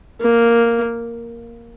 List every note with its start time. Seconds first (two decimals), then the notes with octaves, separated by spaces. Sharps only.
0.21 A#3